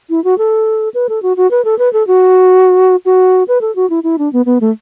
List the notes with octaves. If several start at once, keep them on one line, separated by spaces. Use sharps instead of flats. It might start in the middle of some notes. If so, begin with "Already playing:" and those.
E4
F#4
A4
B4
A4
F#4
F#4
B4
A4
B4
A4
F#4
F#4
B4
A4
F#4
E4
E4
D4
B3
B3
A3